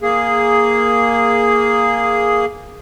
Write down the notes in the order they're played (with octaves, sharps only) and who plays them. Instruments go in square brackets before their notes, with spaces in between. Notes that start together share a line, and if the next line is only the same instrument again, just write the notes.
[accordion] A#3 G#4